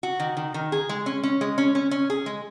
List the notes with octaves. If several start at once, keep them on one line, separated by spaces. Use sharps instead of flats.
F#4
D#3
D#3
D#3
G#4
G#3
C#4
C#4
G#3
C#4
C#4
C#4
G#4
G#3